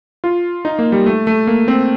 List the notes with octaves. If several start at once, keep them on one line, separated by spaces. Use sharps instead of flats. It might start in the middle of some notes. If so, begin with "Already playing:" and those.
F4
D#4
A#3
G3
A3
A3
A#3
C4